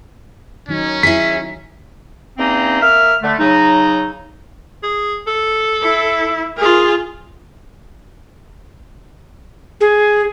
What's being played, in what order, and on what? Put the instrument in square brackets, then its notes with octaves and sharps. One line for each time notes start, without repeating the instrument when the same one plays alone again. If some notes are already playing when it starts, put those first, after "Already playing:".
[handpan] D#3 F#3 D#4 [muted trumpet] C#4
[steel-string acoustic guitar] E4 G#4 [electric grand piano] B6
[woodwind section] E2 A#3 C4 C#4 D#4
A#3 E5 F6
D3 A3
C#3 F#3 D#4
[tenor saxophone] G#4
A4
[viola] E4
[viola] F4 G#4 [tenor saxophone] A#4
[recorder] G#4